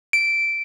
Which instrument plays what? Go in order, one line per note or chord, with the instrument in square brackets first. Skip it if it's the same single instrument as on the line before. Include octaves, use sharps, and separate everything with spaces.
[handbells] D7